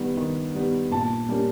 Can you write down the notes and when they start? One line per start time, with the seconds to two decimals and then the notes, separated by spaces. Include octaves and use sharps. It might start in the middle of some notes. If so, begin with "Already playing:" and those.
Already playing: D#3 G3 B3
0.17 D#3
0.54 G3 B3
0.91 A#2 A5
1.29 G3 A#3 C#4